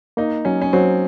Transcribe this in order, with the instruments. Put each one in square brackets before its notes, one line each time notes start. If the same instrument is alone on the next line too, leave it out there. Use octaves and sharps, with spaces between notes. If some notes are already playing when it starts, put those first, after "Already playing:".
[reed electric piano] A#3 [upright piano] D#4
[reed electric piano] F#3 [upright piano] C#4
[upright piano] C#4
[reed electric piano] F#3 [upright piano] C4